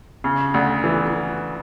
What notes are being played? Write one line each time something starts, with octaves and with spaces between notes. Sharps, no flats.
C#3
D2
E3